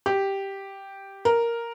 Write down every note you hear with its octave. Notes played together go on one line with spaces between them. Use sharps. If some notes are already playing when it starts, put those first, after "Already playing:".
G4
A#4